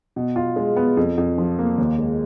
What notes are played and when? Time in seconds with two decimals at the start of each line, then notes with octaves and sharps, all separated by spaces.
0.16 B2
0.36 F4
0.56 G#3
0.76 B3
0.97 F2
1.18 F2
1.38 F3
1.59 A#3
1.78 D#2
1.98 G#3